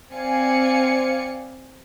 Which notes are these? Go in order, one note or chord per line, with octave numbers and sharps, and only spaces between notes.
C4 D5 F5 G#5 C#7